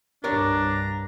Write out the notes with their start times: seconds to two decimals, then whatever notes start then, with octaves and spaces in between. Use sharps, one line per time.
0.24 C2 G2 D4 G4 A#4 C#5 A#5